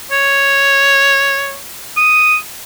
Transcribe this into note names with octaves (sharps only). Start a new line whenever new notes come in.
C#5
D#6